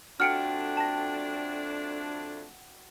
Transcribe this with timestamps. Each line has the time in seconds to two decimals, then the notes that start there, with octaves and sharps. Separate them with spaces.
0.20 F2 A3 D4 F#4 G5 F6 C#7 D7
0.77 A5 A#6